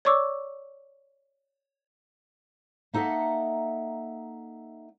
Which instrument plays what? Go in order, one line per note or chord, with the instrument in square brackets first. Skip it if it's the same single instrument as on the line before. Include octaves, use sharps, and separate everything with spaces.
[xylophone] C#5 D5 C#6 D6 E6
[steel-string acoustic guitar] A#3 D#4 A4 D#5 E5 F#5